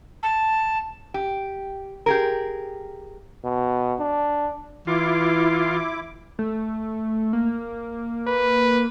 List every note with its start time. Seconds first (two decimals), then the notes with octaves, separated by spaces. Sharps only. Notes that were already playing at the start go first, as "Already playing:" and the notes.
0.23 A5
1.14 G4
2.06 G4 G#4 A#4
3.45 B2
3.99 D4
4.87 E3 E4 F4 C6 D6
6.39 A3
7.33 A#3
8.27 B4